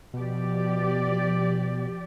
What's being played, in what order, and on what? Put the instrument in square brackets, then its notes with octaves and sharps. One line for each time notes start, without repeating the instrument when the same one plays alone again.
[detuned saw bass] B2 [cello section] F3 G4 D5